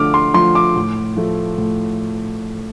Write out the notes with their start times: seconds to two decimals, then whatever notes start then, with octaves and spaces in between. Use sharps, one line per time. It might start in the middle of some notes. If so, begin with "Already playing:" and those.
Already playing: D3 F3 A3 D6 F6
0.14 C6
0.34 F3 A3 C6
0.55 D6
0.76 A2
1.17 F3 A3
1.58 A2